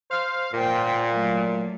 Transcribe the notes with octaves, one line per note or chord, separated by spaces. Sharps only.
C5 F5
A#2 C5 G5
F#3 A3